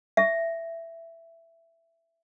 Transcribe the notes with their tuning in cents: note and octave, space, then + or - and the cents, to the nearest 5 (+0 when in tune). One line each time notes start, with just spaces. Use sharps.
E5 +10